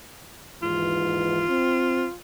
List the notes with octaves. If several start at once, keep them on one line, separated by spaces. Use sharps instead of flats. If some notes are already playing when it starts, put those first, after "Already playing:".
D#2 G#2 E3 F4
C4